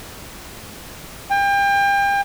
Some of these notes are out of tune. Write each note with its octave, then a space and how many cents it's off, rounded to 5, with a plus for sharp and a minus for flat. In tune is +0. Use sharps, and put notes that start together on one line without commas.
G5 +35